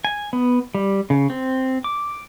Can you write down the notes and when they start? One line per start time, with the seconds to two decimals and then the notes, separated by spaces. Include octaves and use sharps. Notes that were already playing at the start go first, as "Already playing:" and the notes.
0.05 G#5
0.33 B3
0.75 G3
1.10 C#3
1.30 C4
1.84 D6